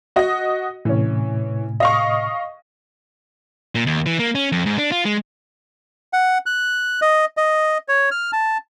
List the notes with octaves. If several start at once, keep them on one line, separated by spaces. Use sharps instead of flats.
F#4 D#5
A2 C3 E3 C#4
D#5 F5 C#6
A#2
D#2
E3
A#3
C#4
F2
G#2
D4
F4
G#3
F#5
F#6
D#5
D#5
C#5
F6
A5